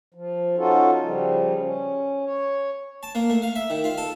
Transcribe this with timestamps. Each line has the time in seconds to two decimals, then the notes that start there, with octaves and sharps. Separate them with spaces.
0.14 F3
0.58 C#4 D#4 F4 F#4 A4
1.04 C#3 F3 G3
1.62 C#4
2.25 C#5
3.03 A5
3.15 A#3
3.30 A3
3.42 F5
3.56 E5
3.70 D#3
3.84 F4
3.98 A4